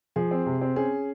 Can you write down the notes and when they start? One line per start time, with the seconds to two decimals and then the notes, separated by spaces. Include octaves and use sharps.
0.16 F3 G#4
0.31 C4
0.46 C3
0.61 C4
0.76 C#4 G#4